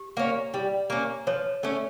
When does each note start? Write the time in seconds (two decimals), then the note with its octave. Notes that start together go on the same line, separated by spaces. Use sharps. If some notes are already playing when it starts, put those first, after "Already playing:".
Already playing: G4
0.17 A#3 C#4
0.54 G3
0.90 A#3 C#4
1.27 F3 C#5
1.63 A3 C#4